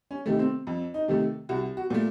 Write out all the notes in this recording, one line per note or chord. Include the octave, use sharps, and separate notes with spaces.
C#4
C3 D#3 A3
C4
F2
D#4
C3 D#3 A3
C2 F#4
F#4
A#2 A3